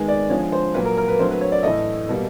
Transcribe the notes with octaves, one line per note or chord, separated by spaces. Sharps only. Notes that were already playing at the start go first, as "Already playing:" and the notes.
Already playing: D#3 G#3 B3
D5
D3 F3 G#3 C#5
C5
A#2 F#3 A#3 B4
A#4
A#4
B4
D3 F#3 A3 C5
B4
C#5
D5
A2 E3 A3 D#5
B2 G3 A#3